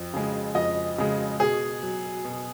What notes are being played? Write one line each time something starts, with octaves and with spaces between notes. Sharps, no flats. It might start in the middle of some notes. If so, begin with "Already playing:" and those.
Already playing: F2
C#3 G#3
F2 D#5
C#3 G#3
B2 G#4
F#3
B2